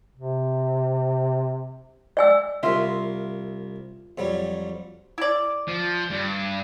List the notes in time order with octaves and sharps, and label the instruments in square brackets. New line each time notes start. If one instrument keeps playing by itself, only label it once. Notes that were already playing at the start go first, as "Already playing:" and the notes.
[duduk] C3
[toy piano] D5 G#5 E6
[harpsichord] C2 A#4 [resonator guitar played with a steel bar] F4 E5
[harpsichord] F2 F#3 G3
[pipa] E4 D5
[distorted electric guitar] F3
G2